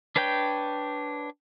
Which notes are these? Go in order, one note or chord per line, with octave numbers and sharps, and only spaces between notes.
D4 B4 C#5 G5 G6